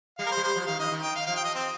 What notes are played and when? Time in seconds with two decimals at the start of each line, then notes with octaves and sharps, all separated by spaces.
0.19 G3 F5
0.26 A#4
0.32 C5
0.37 G3
0.44 C5
0.56 F3
0.67 D#3 F5
0.79 D#3 D#5
0.91 D#3
1.03 G5
1.16 F5
1.27 F3 F5
1.36 G5
1.45 D#5
1.55 C4